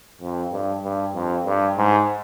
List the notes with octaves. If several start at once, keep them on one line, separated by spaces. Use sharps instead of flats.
F2
G2
G2
F2
G2
G#2